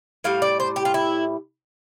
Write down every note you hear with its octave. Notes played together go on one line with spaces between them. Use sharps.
A2 G3 F5
D5
C5
G4
F4
E4